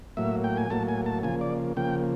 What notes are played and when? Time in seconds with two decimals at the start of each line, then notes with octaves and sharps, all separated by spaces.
0.17 A2 F#3 A#3 E5
0.44 G5
0.57 G#5
0.70 A2 F#3 A#3 A5
0.89 G#5
1.06 A5
1.23 C#3 F3 A#3 G#5
1.41 D5
1.76 C#3 F3 A#3 G5